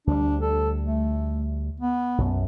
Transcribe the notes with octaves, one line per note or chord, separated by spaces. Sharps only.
D2 G3 D4
A4
A3
B3
B1 F#2